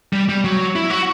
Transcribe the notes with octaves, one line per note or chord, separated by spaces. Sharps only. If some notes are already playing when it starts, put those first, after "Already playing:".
G3
G3
F#3
E4
F#4